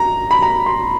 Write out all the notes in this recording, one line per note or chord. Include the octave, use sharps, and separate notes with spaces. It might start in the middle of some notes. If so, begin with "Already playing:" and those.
Already playing: A#5
B5
A#5
C6